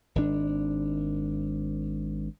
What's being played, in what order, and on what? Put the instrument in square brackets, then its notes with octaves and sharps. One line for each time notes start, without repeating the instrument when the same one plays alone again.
[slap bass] G#1 D#3 D4